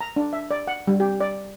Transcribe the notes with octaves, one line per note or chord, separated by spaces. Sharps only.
A#5
D4
E5
D5
F#5
G3
G4
D5